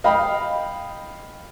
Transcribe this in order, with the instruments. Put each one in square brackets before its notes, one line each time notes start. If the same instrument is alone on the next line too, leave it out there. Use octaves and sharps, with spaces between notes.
[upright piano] D#5 F5 G5 B5